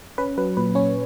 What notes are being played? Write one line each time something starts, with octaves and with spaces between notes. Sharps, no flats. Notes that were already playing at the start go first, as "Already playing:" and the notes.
C#4 B4
F#3 B4
A#2 B4
C#4 C#5